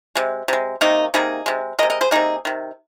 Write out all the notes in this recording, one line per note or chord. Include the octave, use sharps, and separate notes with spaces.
C3 G#3
C3 G#3
C3 D#3 A#3 D#4
C3 D#3 A#3 D#4 G#4
C3 G#3
C3 G#3 A#4 D#5
A#4 D#5
G#4 C5
C3 D#3 A#3 D#4 G#4
C3 D#3